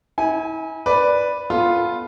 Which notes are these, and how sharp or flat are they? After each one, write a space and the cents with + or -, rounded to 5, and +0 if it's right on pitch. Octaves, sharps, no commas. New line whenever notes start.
E4 -40 G#5 +0
B4 +0 D5 +0
B3 +0 F4 +0 A4 -20